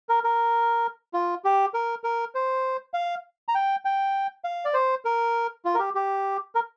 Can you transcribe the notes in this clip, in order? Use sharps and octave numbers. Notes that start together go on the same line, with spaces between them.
A#4
A#4
F4
G4
A#4
A#4
C5
F5
A#5
G5
G5
F5
D5
C5
A#4
F4
A#4
G4
G4
A#4